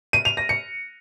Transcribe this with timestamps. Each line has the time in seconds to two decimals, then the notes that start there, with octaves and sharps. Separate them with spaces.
0.13 D#7
0.25 F7
0.37 A#6
0.49 C#7